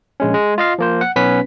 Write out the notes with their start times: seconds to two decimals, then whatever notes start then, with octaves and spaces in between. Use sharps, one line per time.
0.20 A#1 G#3 C#4
0.34 G#3
0.58 F4 D#5 F5
0.78 F3 A#3 C5
1.01 F#5
1.16 B1 B3 C#4 B4 B6